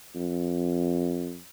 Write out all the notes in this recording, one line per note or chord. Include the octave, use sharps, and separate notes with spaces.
F2